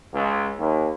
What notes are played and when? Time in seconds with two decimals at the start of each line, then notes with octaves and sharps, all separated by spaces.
0.13 C#2
0.58 D#2